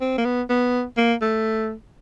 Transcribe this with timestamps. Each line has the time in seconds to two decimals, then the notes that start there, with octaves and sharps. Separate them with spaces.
0.01 C4
0.18 A#3
0.25 B3
0.49 B3
0.97 A#3
1.21 A3